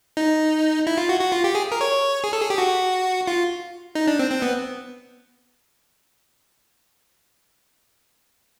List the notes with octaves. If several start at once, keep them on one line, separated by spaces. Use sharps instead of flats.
D#4
E4
F4
F#4
F#4
F4
G4
G#4
A#4
C#5
G#4
A4
G#4
G4
F#4
F4
D#4
D4
C4
C4
B3